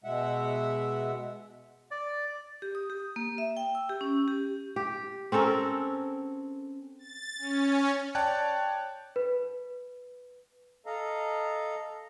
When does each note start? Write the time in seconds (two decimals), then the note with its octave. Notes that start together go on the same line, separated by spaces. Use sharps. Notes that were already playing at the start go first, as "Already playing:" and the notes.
0.04 B2 G#3 E5 F#5
1.91 D5
2.62 G4
2.75 D#6
2.90 G4
3.16 A#3
3.38 E5
3.57 G5
3.75 E6
3.89 G4
4.01 C#4
4.28 G4
4.76 G4
5.32 C4 C#4 A4 A#4
6.99 A6
7.38 C#4
8.15 C#5 D5 G5 A5 F#6
9.16 B4
10.86 A4 D#5 F5 A#5